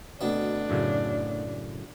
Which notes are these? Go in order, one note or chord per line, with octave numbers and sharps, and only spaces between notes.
D2 B2 C4 D4
F#2 A2 C#3